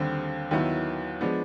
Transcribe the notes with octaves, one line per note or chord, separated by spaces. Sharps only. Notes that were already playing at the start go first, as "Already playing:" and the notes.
Already playing: D#2 D3 G3 C4
D#2 D#3 F#3 B3 E4
F3 G#3 B3 D4